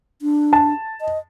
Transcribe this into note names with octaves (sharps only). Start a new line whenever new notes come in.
D4
A5
D#5